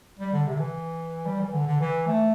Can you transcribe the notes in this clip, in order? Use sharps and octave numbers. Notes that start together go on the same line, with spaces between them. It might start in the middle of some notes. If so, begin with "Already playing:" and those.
G3
D3
C3
D3
E3
G3
E3
D3
D3
E3
A3